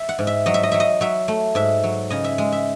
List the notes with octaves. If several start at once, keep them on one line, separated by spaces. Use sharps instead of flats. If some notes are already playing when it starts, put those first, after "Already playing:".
Already playing: E5
F#5
G#2
E5
F#3 D#5
E5
D#5
F#3 E5
D#5
F#3 E5
A3
G#2 E5
F#3
C#3 D#5
E5
G#3
E5